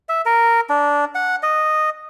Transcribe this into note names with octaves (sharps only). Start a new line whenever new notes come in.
E5
A#4
D4
F#5
D#5